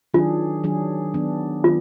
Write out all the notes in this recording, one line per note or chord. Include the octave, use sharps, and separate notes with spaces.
D#3 F#3 D4 F4 G#4
D#3 F#3 D4 G#4
D#3 F#3 B3 D4
D#3 F#3 B3 F4